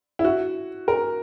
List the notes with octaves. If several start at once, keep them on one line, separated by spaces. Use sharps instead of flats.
E4
F#4
A#4